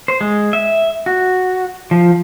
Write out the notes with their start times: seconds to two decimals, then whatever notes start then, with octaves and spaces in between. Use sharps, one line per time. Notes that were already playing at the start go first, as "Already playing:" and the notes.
0.08 C5
0.21 G#3
0.53 E5
1.06 F#4
1.91 F3